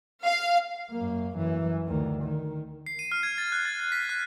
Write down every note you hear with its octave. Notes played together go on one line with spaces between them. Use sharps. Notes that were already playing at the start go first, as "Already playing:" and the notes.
F5
F#2 A#3
F#2 E3
D2 D#3
D#3
C7
D#7
F6
G#6
A6
F#6
A6
A6
B6
F#6